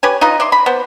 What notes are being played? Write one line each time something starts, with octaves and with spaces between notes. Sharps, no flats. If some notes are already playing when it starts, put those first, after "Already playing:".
G4 B4 C#5 G#5
D#4 F4 B4 D#5
D5 E5 C6
B5
B3 C5